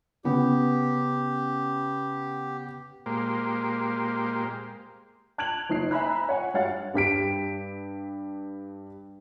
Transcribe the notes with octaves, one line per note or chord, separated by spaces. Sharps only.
C#3 B3 G4
A#2 G#3 A#3 G4 C5
A5 F#6 G#6 D7 F7 F#7
F#1 D#4 C7
E5 G#5 A#5 B5 F#6
C#5 F#5 G#5
G2 F#4 C#5 F5 F#5 A6
G2 G4 B6 D7